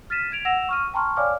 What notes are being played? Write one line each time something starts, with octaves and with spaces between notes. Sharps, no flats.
F6 A6 B6 D#7 E7
G#6 D7 F7
F#5 E6 A#6 E7 F7
C#6 F6 D#7
G5 A5 A#5 C6 C#6 F6
C#5 D5 F5 G#5 D6 F6